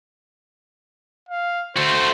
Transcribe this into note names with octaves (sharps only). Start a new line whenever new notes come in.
F5
A3 F#4 C5